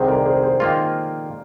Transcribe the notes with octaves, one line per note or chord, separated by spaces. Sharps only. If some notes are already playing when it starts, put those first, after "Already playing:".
Already playing: C2 C3 D#3 G#4 C5
A#4 D5
G#4 C5
G#4 C5
D#3 A#3 F4